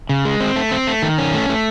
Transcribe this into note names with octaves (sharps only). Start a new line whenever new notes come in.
C#3
G#3
C4
A3
C4
A3
D#3
C#4
A3
A3